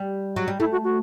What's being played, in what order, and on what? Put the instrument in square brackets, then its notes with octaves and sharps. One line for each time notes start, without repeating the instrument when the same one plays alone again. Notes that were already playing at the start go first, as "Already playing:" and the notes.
Already playing: [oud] G3
F#3
G3
[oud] A3 [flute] E4
[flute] F#4
F#4